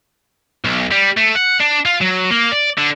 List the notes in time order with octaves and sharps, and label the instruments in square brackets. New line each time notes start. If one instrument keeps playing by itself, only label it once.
[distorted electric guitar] B1
G3
A3
F#5
D4
F4
F#3
A#3
D5
D3